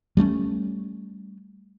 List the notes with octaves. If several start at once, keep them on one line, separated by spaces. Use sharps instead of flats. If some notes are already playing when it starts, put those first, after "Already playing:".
G3 A3 C4 C#4